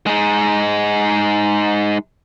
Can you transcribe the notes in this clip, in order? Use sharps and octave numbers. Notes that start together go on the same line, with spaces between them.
G#3 D#4